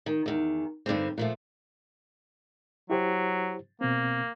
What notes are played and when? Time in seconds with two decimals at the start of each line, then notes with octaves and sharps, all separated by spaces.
0.06 D#3
0.26 E2 D#3
0.86 G2 D3 D#3 C4
1.18 A#2 F3 A3
2.90 F#3 E4 G4 C5
3.81 B2 A#3 C4